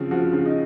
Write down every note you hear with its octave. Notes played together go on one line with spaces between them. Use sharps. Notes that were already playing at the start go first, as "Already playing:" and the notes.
Already playing: C#3 F3 C4
F3 F#4
C#3
D#4